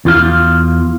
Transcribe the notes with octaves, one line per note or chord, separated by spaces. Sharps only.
E2 F4 F5